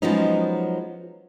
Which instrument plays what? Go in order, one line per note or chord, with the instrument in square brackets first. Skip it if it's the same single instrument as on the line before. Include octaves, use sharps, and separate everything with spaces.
[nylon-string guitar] F3 F#3 G#3 B3 C#4 D#4